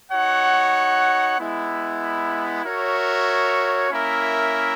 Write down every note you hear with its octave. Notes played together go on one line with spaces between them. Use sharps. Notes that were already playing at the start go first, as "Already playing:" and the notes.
D#4 F#4 C#5 F#5
G#3 B3 E4
F#4 A#4 C#5 E5
A#3 C#4 E4 A#4 E5